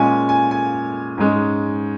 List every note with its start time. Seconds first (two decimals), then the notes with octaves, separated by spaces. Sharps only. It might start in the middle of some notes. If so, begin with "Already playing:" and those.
Already playing: A#2 G#3 C#4 G#5
0.29 G#5
0.51 G#5
1.18 G#2 G#3 C#4